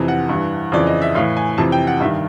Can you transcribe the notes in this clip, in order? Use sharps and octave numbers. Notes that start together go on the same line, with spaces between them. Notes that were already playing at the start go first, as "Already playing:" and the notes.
Already playing: F2 C3 E3
F#5
G2 E3
F2 C#3 E3 D5
D#5
E5
A2 E3 F5
G#5
F2 C3 E3 A5
G5
F#5
G2 D#3 E5